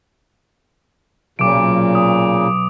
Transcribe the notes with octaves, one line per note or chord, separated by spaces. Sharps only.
B1 A#2 C#3 D6 D7
D#6